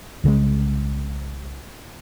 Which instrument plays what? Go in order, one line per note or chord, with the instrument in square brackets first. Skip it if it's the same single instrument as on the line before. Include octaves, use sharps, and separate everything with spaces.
[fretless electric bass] C2 C#3 F3 G#3